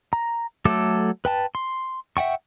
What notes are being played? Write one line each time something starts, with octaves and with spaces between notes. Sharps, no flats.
A#5
F#3 A3 A4 D6
B4 G5 A5
C6
E5 F#5 G5 C#6